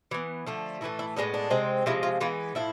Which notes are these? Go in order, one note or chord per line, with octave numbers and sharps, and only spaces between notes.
E3 B3
D3 F3 A3
A2 E3 A3 E4
E4
A2 G#3 B3 D4
D4
C3 G#3 C4
C3 F3 G#3 E4
F4
E3 G#3 B3 F4
A2 F3 E4